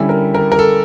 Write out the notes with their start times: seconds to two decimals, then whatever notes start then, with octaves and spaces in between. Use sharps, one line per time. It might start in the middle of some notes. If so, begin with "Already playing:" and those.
Already playing: D3 G3 C#4 E4 A4
0.09 A#4
0.34 A#4
0.52 A#4
0.59 A4